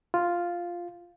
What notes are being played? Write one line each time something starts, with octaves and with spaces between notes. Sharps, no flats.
F4